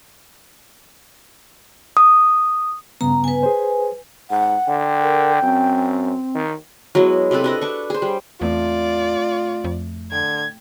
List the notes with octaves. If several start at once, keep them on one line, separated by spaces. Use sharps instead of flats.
D#6
G2 C#3 B3 A#5
B4 G#5
G#4 C5
G#2 F#5
D3 G5
A#4
F#2 C4
D#3
F#3 G#3 B3 E4
C3 C4 A4 B4
D4 B4 D#5
D4 C#6
G#4 C5
G3
E2 A2 A3 C4 F4 D5
F2
D3 G5 G#6